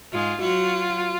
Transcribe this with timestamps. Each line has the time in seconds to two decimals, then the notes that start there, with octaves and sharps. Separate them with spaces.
0.12 G#2 G#3 F4
0.41 F#3 F4 F#4